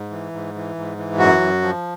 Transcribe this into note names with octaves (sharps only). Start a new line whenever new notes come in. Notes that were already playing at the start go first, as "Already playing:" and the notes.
Already playing: G#2
E3
G#2
E3
G#2
E3
F#2 F#3 F#4
F#2
F3